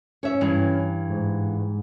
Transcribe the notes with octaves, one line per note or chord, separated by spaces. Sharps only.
C#4 C#5 E5
G2 E3
G#2